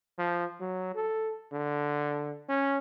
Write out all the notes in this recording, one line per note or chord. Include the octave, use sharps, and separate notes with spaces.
F3
F#3
A4
D3
C#4